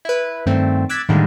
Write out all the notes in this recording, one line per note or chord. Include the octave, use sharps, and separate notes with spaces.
E4 B4
G2 D#3 A3 C4
D6 E6 F#6 G#6 A6 B6
A2 D3 D#3 G3 G#3 A#3